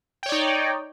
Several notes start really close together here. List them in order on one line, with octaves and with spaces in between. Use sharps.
G5 C#5 D5 D#4